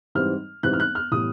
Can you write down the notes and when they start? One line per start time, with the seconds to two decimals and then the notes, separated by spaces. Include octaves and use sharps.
0.15 G#2 E3 G3 C4 F6
0.63 G#2 E3 G3 C4 F#6
0.73 F6
0.80 F#6
0.95 F6
1.11 A2 E3 G3 B3 D#6